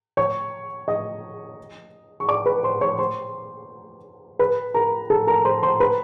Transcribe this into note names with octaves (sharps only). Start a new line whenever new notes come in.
C#5 C#6
D#5 D#6
C#6
D5 D6
B4 B5
C5 C6
C#5 C#6
C5 C6
B4 B5
A#4 A#5
A4 A5
A#4 A#5
C5 C6
C5 C6
B4 B5